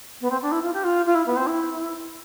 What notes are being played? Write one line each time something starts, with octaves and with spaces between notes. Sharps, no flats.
B3
C4
D4
E4
F4
G4
F4
F4
E4
B3
C4
E4